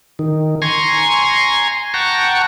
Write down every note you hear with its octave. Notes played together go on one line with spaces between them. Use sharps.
D#3
G#5 A#5 C6 C#6 G#6
F#5 G5 A5 A#5 C#6